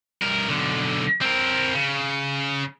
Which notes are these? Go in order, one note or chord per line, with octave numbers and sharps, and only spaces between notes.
G2 A#4
B1 D3
C4 A#4
C#3